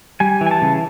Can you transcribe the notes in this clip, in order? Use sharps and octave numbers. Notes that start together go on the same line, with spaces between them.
G3 G#5
E3
G#5
A5
C#3